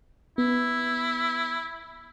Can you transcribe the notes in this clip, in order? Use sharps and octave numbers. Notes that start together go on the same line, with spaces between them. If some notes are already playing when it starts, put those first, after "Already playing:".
B3 E4